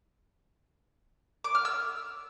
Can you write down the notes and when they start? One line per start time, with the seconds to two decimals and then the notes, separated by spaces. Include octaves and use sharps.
1.44 D6
1.55 F6
1.65 E6